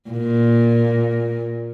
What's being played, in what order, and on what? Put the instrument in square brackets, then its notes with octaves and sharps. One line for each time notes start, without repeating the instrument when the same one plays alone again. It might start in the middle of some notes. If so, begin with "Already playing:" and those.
[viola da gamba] A#2